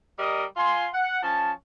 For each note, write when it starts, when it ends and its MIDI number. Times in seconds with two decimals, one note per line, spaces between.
0.19 0.44 55
0.19 0.44 70
0.19 0.44 75
0.57 0.87 65
0.57 0.87 80
0.57 0.87 84
0.93 1.21 78
1.23 1.52 53
1.23 1.52 61
1.23 1.52 81